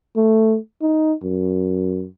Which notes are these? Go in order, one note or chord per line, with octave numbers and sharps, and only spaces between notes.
A3
D#4
F#2